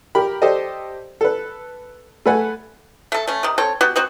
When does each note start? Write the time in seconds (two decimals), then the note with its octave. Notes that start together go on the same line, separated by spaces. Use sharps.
0.15 G4 A#4 B5
0.42 G4 A4 C5 D5 D#5
1.21 A4 B4
2.26 A3 A4 B4 F#5 G#5
3.12 A3 A4
3.27 A3 C#4
3.43 C3 D#3
3.58 C4 A4 C#5
3.81 B3 F#4 G4
3.96 B3 C4 F#4